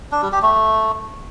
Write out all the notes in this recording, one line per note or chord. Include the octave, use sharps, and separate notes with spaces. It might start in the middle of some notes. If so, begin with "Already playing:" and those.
D4
G3
G4
A3